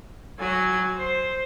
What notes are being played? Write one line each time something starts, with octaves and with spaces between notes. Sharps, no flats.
F#3 G#5
C5